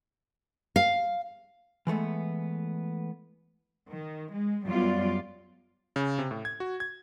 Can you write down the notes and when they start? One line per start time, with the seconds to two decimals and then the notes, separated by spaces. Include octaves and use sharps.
0.76 F5
1.87 E3 G#3 A3 B3
3.92 D#3
4.32 G#3
4.66 F#2 G3 B3 F4 D5
5.96 C#3
6.19 C3
6.31 A2
6.45 G#6
6.60 F#4
6.80 G#6